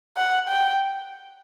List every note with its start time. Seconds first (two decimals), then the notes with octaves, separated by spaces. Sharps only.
0.17 F#5
0.49 G5